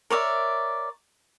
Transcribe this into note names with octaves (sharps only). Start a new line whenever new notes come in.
A#4 C#5 D5 E5